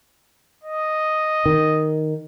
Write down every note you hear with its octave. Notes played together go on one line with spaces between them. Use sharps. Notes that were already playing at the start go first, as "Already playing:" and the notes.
D#5
D#3